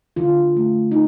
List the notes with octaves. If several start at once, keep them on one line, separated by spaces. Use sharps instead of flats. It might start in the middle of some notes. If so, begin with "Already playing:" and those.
D3 F4
A3
D#4